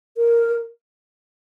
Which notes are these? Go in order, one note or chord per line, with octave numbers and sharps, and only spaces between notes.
A#4